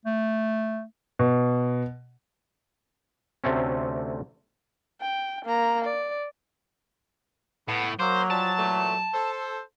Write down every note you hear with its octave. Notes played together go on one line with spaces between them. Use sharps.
A3
B2
D2 C3 A3 C4 C#4
G5
A#3 A#5
D5
A2 B3
F#3 A#3 C5
F3 G3 A5
A#2 E3 A3
A4 C5